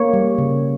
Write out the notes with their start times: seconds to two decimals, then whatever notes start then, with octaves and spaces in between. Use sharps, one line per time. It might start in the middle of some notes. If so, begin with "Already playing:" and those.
Already playing: A#3 C#5
0.13 G3
0.38 C#3